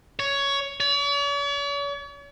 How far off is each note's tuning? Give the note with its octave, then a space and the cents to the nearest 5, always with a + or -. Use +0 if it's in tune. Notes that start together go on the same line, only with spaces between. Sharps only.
C#5 +10
C#5 +45